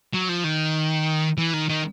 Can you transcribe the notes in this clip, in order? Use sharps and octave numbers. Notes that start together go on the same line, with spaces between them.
F#3
F3
D#3
E3
D#3
D#3